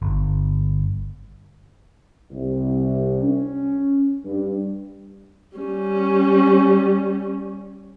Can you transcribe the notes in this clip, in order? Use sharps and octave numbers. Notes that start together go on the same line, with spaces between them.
G1
C2
C#4
G2
G3 C#4